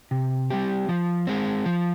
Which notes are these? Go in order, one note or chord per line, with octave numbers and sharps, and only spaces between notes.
C3
G3 C4 G4
F3
G#3 C4
F3